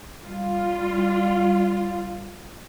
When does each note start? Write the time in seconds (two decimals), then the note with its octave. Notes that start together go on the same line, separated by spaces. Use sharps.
0.23 G3 F4